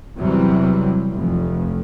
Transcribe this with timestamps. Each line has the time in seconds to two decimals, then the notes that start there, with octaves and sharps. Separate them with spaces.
0.18 E2 C3 E3 F#3 G3
1.13 F1 F2